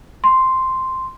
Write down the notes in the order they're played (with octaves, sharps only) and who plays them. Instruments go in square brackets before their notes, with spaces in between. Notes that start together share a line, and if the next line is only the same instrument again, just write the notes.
[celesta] C6